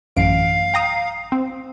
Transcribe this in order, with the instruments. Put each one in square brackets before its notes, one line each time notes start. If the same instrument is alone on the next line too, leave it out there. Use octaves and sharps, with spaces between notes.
[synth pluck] A1 F#2 D7 [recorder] F5
[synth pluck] G5 A#5 D#6
C4